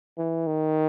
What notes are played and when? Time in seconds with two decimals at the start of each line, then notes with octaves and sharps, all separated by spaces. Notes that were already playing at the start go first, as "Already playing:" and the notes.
0.18 E3
0.47 D#3